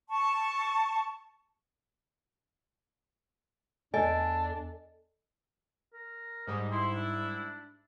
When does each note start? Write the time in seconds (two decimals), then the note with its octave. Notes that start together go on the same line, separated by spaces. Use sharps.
0.09 A5 C#6
3.94 E2 D4 A4 D5 D#5 G#5
5.93 A#4
6.47 G#2 G3 D#5
6.72 E4 C6
6.94 D4